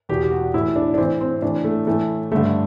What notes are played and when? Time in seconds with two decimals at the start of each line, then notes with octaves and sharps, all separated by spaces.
0.09 E2 B2 G4
0.23 G4
0.31 F#4
0.54 A2 E3 E4
0.76 D4
0.94 D4
0.98 A2 E3 C4
1.21 C4
1.42 A2 E3 D4
1.64 A3
1.87 A2 E3 A3
2.32 G2 D3 A3